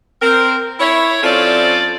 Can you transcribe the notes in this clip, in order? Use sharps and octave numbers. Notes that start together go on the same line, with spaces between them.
C4 A#4
E4 C#5
F3 C4 C#4 F4 A4 D5